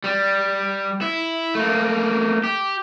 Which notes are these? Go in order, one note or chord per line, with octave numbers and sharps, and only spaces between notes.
G3
E4
A3 A#3
G4